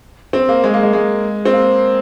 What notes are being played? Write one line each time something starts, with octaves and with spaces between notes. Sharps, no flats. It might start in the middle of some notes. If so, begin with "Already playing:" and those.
C4
A#3
G#3
A#3
G#3
G#3
C4
A#3